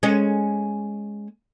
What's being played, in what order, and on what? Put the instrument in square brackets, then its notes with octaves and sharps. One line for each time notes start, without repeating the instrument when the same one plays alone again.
[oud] G#3 C#4